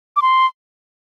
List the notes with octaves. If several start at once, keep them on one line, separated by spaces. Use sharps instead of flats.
D6
C6